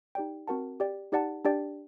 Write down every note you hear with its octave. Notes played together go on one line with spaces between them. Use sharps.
D#4 G4 D5 G5
C4 F#4 A#4 F#5 A5
G4 D5 G5
D#4 G4 D5 F#5 A5
D4 G4 D5 G5